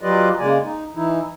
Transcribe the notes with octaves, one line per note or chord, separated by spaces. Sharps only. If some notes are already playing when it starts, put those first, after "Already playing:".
F#3 F4 G4 B4 D5 D#5
C#3 G#3 A#3 D5 G#5
D#4
E3 D#4 E4